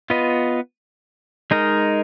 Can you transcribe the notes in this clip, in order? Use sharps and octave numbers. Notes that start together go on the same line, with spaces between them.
B3 F4 B4 D#5
G#3 D#4 A#4